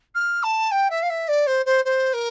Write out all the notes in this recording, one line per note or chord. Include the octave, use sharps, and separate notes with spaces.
F6
A5
G5
E5
F5
E5
D5
C5
C5
C5
A#4